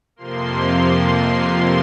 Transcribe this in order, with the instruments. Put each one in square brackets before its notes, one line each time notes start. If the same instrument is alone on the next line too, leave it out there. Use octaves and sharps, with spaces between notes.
[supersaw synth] F2 C3 F3 A#3 C6